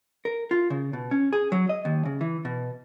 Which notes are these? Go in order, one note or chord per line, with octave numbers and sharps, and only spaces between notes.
A#4
F4
C#3
B2
C#4
G#4
F#3
D#5
D#2
C#3
E3
B2